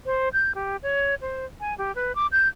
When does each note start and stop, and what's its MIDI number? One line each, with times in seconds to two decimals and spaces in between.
0.06 0.29 72
0.33 0.52 91
0.55 0.77 67
0.83 1.15 73
1.21 1.46 72
1.60 1.77 80
1.78 1.94 67
1.95 2.15 71
2.15 2.27 86
2.32 2.48 91